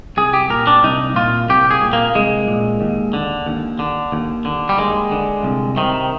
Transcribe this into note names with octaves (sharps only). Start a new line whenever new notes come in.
C2 G#4
G4
A#2 A#4
D4
C2 D#4
A#2 F4
C2 G4
G#4
A#2
A#3
C2 G#3
A#2
D#2
D3
D#2
D3
D#2
D3
G3
D#2 G#3
D3
C2
C3 D#3